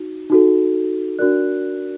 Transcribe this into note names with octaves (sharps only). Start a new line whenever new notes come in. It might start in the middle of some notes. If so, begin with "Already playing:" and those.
Already playing: D#4 F#4
D#4 F#4 A4
D4 F#4 A#4 D5 F#6